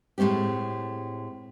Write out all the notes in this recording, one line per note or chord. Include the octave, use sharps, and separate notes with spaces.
A2 G#3 A3 C4 G4